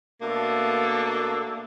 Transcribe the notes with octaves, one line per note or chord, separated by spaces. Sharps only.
B2 A3 A#3 D4 A4